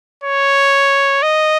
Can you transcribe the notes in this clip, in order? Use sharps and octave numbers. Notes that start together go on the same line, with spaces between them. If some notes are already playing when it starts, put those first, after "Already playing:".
C#5
D#5